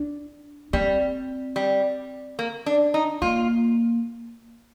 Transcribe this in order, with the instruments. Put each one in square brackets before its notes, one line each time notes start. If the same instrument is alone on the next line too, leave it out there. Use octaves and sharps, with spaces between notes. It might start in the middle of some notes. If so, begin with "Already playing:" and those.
Already playing: [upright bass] D4
[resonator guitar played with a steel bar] G3 [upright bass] C4
[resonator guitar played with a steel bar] G3
A#3
D4
D#4
[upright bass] A#3 [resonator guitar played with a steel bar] F4